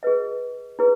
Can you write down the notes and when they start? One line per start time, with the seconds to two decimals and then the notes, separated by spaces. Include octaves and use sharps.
0.03 G#4 B4 D#5
0.79 E4 G#4 B4